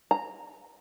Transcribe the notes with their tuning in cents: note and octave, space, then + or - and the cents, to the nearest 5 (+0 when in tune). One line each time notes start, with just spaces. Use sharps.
A#5 -10